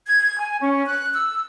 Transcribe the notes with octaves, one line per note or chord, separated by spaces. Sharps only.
G#6
G#5
C#4
F#6
E6